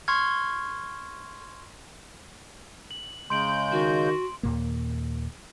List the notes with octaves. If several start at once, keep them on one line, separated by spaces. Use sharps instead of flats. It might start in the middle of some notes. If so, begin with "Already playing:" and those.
C6 C#6 F6 G#6
F#7
C#3 G#3 C6 G6 D7 F#7
D#3 F#4
D#2 A#2 A#3